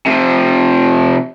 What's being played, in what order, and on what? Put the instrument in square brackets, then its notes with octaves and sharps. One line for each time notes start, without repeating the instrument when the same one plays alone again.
[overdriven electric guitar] C3 F3